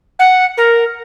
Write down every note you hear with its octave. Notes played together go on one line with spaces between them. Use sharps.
F#5
A#4